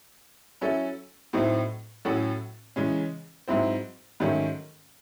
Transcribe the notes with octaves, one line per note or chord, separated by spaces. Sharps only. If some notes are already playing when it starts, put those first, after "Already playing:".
F#3 C#4 E4 A4
A2 F#3 A3 C4 D#4
A2 F#3 C#4 F#4 A4
C#3 E3 G#3 C#4
G#2 F#3 C4 E4 C5
G#2 D#3 F#3 A3 C#4